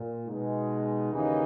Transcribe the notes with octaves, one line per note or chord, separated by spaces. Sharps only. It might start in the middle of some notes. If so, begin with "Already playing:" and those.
Already playing: A#2
B2 G#3 D#4
D#2 C#3 E3 A#3 D#4